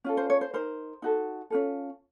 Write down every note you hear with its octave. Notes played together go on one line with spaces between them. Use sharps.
C#4 F4 A4
C5
C#5
C5
D#4 A#4 C5
D#4 F#4 A4
C#4 F4 A4